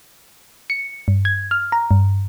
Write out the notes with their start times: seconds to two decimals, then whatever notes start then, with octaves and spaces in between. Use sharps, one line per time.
0.70 C#7
1.08 G2
1.25 G#6
1.51 F6
1.72 A#5
1.91 G2